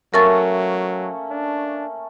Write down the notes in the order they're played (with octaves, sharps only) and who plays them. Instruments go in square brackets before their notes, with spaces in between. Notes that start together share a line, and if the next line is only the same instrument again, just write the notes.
[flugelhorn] F#3 [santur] A3 A#3 C#4 [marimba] A#4 C#6 A6
[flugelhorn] D4